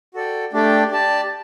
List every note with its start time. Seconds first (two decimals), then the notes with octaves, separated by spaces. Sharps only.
0.14 F#4 A4 D5 G5
0.53 A3 D4 G4 D5 G5
0.91 G4 D5 A5